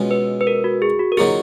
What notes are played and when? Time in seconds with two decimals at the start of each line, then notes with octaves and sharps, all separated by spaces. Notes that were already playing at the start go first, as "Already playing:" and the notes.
Already playing: B2 G#3 C#4 F4
0.11 B4
0.41 B4
0.47 A#4
0.64 F#4
0.82 G#4
0.99 F#4
1.12 A#4
1.17 D#3 F#3 A#3 F4 G#4